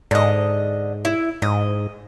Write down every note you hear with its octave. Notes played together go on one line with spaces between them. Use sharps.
G#2 D3 D#5
E4
G#2 D#5